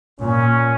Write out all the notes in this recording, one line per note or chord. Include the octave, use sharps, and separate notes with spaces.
A#2 C#4